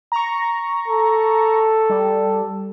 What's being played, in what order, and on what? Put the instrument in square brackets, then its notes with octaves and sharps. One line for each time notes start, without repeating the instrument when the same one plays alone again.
[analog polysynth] A#5 C#6
[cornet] A4
[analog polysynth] G3